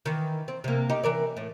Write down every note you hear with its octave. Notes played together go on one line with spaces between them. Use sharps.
D#3 E3
C4
C3 A#3
D#4 G4
E3 A#4 D5
A2